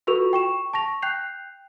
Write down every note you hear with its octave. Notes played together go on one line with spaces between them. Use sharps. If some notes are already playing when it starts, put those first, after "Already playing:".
F4 F#4 A4 B4 C#6 F7
G5 C#6 E7
A5 C#6 A#6 F7
G5 F#6 G6 C7 F7